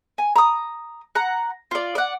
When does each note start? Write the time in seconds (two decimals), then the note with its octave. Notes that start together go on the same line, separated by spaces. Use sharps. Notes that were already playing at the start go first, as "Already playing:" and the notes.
0.18 G#5
0.36 A#5 D#6
1.15 F#5 A#5
1.71 F4 D5
1.95 D5 F#5